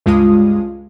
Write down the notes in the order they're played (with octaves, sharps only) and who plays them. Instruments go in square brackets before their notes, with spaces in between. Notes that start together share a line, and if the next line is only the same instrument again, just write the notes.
[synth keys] C#2 G2 G#3 F4 F5 D#6